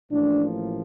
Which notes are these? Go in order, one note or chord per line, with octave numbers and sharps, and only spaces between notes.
A1 A2 F3 A#3 D4